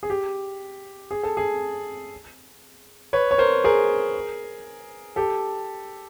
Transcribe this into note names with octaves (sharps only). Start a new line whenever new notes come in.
G#4
G4
G#4
A4
G#4
B4 C#5
C#5
A#4 C5
G#4 A#4
G4 A4